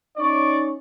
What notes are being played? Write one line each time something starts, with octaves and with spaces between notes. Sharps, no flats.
C#4 D#4 D5 C#6